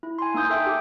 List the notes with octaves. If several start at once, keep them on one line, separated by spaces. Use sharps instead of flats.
E4
G#5 C6
A#3 D#4 G#5 D#6 G6
A4 E5 G5
G4 D6